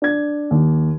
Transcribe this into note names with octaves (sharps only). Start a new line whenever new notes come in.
D4 G#6
D#2